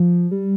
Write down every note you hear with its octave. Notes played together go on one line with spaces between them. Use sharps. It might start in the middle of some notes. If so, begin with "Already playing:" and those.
Already playing: F3
G3